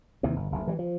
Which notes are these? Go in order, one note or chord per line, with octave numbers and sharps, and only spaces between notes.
D#2 C3 E3
G1
F#1 D2
E3 F#3 G3
F3